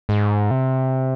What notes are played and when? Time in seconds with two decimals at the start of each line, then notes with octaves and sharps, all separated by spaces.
0.09 G#2
0.51 C3